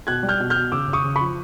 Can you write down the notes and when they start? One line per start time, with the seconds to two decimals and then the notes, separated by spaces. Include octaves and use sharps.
0.07 B2 F#6 G#6
0.23 G3
0.29 F6 G6
0.40 B2
0.50 F6 G6
0.56 B2
0.72 C#3 D6 E6
0.88 C#3
0.93 C#6 D#6
1.04 C#3
1.16 B5 C#6
1.20 F3